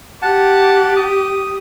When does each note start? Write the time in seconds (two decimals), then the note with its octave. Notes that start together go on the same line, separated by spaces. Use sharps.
0.22 G4 F#5 A5
0.96 D#6